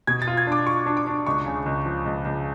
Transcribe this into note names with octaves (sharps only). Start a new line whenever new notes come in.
B2 G#6
A6
F4
G#6
D4 D6
F4 C#6
D4
D6
D4
C#2 C#6
C#3
C#2
F3
C#2
C#2